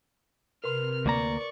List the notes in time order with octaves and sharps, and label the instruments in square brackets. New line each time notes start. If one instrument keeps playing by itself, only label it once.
[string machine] C3 [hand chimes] A#4 B4 C6 [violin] F6
[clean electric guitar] D2 A#3 A#5 [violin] D5 C#6